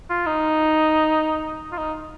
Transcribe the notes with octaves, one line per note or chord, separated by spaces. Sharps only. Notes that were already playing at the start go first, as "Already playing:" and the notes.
F4
D#4
F4
D#4